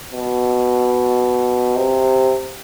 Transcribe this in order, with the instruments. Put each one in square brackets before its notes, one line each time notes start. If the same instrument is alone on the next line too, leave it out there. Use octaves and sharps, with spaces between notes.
[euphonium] B2
C3